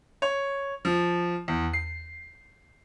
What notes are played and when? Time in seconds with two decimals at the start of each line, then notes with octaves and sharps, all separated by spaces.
0.22 C#5
0.85 F3
1.48 E2
1.73 C7